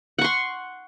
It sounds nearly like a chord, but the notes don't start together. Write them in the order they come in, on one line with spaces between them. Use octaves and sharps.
F#5 C#6 C6